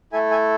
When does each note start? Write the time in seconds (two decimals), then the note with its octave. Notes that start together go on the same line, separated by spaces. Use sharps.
0.12 A3 E4 A4 E5 G#5
0.31 E5 G#5